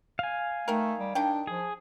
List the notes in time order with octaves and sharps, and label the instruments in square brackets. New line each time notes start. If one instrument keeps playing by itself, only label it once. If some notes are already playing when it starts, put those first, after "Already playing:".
[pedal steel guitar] F5 G#5
[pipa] D#3 A#4 [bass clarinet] A3
[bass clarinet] G3
[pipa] D#3 G5 [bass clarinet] D4
[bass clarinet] F3 [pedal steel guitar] G#4